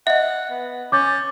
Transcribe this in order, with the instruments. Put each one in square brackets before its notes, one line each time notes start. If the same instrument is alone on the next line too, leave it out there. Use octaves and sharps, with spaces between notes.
[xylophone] D#5 E5 [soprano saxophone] F#5
[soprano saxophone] B3
[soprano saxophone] C#4 [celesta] D6 G6 A6